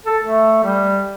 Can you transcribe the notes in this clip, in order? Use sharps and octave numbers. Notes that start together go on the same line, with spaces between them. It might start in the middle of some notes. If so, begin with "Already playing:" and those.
A4
A3
G3